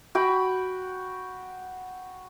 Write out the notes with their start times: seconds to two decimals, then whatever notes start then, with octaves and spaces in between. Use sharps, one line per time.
0.15 F#4 G5 B5